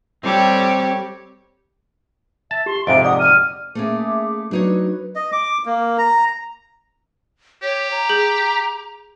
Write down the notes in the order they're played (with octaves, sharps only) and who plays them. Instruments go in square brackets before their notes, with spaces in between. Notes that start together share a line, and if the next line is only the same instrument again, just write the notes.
[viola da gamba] G3 G4 C#5 [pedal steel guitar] C4 A4
[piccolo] E5 [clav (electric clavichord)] A5
[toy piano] G4 [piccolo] C6
[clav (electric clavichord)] F2 G#2 C3 [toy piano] D#5 [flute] E5 [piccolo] D7
[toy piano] D5 D6 [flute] F#5 [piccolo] D#6
[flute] F6 [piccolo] D#7
[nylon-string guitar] A3 A#3 C#4 [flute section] G#4 E5 D6
[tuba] F#3 [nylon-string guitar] D4 D#4 C#5 [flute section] B4
[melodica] D#5
D6
A#3
A#5
[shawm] G4 [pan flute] C#5
[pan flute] A#5
[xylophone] G#4 G6 F#7